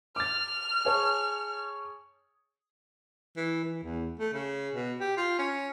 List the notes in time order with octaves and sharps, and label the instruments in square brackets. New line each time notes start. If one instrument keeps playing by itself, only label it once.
[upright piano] D6 A6 [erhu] F6
[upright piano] G#4 C#5 A5
[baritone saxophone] E3
E3
E2
A3
C#3
B2
G4
F4
C#4